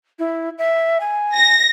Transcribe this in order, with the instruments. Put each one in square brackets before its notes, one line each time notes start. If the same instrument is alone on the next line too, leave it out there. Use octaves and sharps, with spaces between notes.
[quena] E4
E5
G#5
[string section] A#6